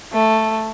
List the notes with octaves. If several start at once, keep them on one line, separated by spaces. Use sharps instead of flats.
A3